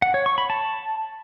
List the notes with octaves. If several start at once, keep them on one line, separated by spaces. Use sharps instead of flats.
F#5
C#5
C#6
B5
A5